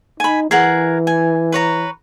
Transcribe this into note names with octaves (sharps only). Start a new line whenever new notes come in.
D#4 G#5 B5
E3 G#4 A#4 F#5
G#5
B4 C#5 A#5